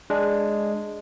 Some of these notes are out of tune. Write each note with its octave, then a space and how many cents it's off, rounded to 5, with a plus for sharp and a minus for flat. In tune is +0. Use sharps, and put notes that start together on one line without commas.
G#3 +0 D4 +0